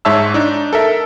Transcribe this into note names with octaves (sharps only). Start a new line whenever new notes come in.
G#2 C#5 E5 A5 E6
D4 D#4
A4 A#4 E5